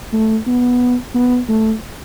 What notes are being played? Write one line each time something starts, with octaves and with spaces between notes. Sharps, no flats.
A3
B3
B3
A3